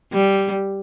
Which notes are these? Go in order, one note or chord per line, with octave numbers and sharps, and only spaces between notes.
G3